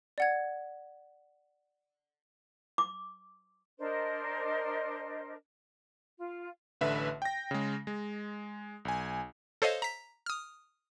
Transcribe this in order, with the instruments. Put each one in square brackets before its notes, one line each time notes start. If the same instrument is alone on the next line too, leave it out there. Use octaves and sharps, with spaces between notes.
[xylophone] D5 F#5 G#6
[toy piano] D6
[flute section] D4 A#4 C5 D#5
F4
[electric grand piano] A1 D3 B4 E5
G5 A#6
C#3 G#3
G#3
B1 G#5
[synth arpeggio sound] A4 C5 C#5 D#5 F5
A#5 B6
D#6 F6